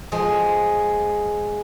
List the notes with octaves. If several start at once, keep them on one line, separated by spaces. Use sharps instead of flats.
F3 G#3